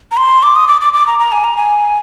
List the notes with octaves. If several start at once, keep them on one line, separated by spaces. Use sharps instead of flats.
A#5
C6
D6
D#6
D6
D6
D6
A#5
A#5
G#5
A#5
G#5